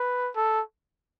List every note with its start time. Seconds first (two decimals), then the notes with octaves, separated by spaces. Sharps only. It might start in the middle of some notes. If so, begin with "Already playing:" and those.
Already playing: B4
0.36 A4